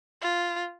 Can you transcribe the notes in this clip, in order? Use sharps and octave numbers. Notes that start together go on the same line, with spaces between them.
F4